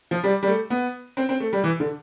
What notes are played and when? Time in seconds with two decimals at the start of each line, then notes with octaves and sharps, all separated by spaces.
0.11 F3
0.24 G3
0.43 G3
0.47 A3
0.70 B3
1.17 C4
1.29 C4
1.40 A3
1.53 G3
1.64 E3
1.80 D3